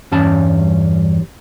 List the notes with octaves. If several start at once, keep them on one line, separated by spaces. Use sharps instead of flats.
E2 G2 G3 C#4 A5